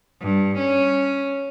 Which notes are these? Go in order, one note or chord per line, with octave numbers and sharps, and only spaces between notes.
G2
C#4